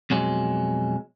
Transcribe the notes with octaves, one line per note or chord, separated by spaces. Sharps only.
F2 B2 F#3 G#3